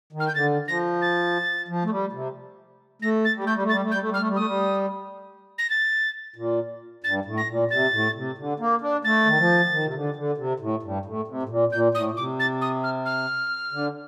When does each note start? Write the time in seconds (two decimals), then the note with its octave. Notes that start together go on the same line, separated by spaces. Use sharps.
0.13 D#3
0.20 F6
0.27 G6
0.34 D3 A6
0.68 F3 A#6
1.01 A6
1.68 F3
1.84 A3
1.90 G3
2.13 C3
3.02 A3 A#6
3.24 A6
3.35 G3
3.44 A3 G6
3.54 G3
3.63 A3
3.69 A6
3.72 G3
3.82 A3
3.91 G3 G6
4.00 A3
4.09 G3
4.14 F6
4.19 A3
4.27 G3
4.36 A3 D#6
4.46 G3
5.58 A#6
5.70 A6
6.36 A#2
7.04 G2 A6
7.25 A2
7.37 A#6
7.49 A#2
7.70 C3 A6
7.92 A2
8.15 C3
8.38 D3
8.60 A#3
8.81 D4
9.04 A3 A6
9.26 D#3
9.38 F3
9.71 D#3
9.85 C3
9.94 D3
10.16 D3
10.38 C3
10.60 A2
10.83 G2
11.05 A2
11.28 C3
11.43 A2
11.49 A#2
11.72 A#2 G6
11.94 A2 D#6
12.11 A#2
12.17 C3 D6
12.39 A6
12.61 D#6
12.83 F6
13.05 F6
13.72 D3